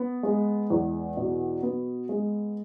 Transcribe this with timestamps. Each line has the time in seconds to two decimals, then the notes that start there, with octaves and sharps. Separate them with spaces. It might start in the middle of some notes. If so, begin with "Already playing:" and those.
Already playing: B3
0.23 G#3
0.70 E2
1.17 B2
1.63 B3
2.09 G#3